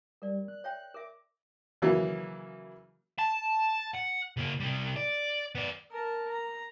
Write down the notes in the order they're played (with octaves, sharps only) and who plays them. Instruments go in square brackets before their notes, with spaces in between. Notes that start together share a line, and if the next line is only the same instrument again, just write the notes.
[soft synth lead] G3 [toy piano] A#4 D5
[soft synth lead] F#6
[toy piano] C#5 E5 G5
[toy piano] A#4 E5 [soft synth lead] D6
[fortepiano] C#3 E3 F#3 A#3
[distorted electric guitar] A5
F#5
C#3 A#3
C3 G3
D5
B3 D5
[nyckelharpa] A#4 A5
A#5